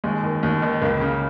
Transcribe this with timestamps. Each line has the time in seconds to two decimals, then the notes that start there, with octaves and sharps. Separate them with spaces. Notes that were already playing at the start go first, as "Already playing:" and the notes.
0.04 D#2 G#3
0.23 D#3
0.43 D#2
0.62 D#3
0.82 C#2 A#3
1.01 C#3